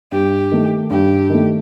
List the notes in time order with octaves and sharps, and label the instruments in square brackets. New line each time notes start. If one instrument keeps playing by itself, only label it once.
[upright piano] G2 [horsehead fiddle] G4
[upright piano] D#3 A3
[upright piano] G2 [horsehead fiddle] G4
[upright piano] D#3 A3